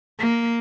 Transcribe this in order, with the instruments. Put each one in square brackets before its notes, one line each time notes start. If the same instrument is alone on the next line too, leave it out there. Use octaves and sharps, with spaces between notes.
[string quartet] A#3